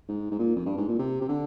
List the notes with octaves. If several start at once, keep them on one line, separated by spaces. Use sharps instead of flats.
G#2
G#2
A#2
F2
G2
G#2
A#2
C3
C3
D3